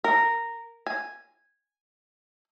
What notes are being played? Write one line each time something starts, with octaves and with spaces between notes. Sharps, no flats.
A#4
G#5